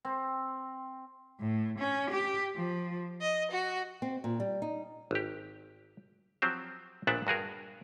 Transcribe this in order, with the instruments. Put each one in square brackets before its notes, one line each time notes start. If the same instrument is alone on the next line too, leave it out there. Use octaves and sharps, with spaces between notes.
[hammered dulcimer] C4
[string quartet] A2
C#4
G4
F3
D#5
F#4
[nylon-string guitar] C4
A#2
G3
D#4
[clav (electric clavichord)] G#1 G4
F3 F#3 C4 G4 C5
A#1 A#2 B3 D4 E5 F#5
G2 F#4 G#4 A#4